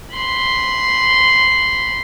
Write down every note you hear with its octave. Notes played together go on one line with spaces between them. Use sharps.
B5 C6